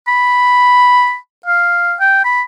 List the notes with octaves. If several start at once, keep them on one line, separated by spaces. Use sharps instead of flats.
B5
F5
G5
B5